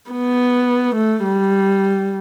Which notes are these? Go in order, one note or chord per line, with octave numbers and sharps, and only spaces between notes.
B3
A3
G3